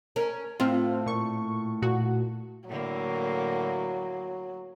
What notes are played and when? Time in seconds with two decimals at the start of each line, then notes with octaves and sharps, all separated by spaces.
0.16 C#4 A#4
0.60 A2 C4 F4
1.06 A#2 C#6
1.82 A#2 F#4
2.69 A2 D3 F#3 A#3